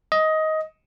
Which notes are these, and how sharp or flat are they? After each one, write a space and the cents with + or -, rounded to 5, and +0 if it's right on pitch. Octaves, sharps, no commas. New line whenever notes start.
D#5 +15